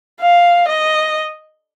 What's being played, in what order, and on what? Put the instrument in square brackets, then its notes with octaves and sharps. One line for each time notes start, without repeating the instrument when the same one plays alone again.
[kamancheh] F5
D#5